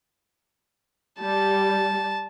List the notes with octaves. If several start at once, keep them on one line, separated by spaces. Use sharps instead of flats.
G3 A5